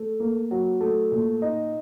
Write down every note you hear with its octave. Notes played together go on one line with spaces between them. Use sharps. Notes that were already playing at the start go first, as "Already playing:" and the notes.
Already playing: A3
A#3
F#3
A3
A#2
D#4